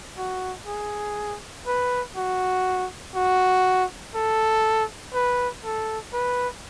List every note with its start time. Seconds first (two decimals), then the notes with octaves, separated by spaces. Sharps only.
0.18 F#4
0.67 G#4
1.67 B4
2.16 F#4
3.15 F#4
4.15 A4
5.14 B4
5.64 A4
6.13 B4